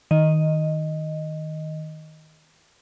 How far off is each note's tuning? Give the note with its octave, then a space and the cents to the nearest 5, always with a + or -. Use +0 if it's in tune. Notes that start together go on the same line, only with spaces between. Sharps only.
D#3 +10 D#5 +0